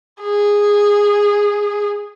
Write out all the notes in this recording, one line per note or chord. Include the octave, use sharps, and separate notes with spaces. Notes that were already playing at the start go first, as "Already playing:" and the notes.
G#4